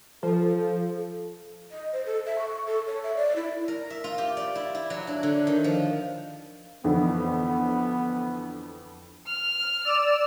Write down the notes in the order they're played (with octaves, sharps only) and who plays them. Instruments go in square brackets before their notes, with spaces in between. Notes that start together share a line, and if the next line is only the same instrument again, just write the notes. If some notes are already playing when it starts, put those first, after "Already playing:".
[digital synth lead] F3 [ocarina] A4
[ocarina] A4
[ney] D#5
C5
A4
E5
C#6
A4
C#5
E5
D5
E4
[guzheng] A#4
E5
F4
G4
D5
E4
E4
F#3
D4
D3
D#3
F3
[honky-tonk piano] F2 D3 E3 [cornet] B3
[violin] F6
[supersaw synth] D5 E6 E7